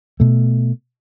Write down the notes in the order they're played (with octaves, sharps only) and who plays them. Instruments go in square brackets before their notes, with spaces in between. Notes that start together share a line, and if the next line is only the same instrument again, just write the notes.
[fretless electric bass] B2 A3